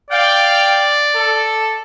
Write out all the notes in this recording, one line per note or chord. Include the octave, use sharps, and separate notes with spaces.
D5 F5 G5
A4